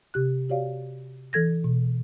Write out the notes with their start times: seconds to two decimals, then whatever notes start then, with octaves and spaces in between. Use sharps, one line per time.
0.14 C3 G4 F#6
0.49 F#4 G4 C#5 D5 F5
1.33 E3 A4 G#6 A#6
1.64 B2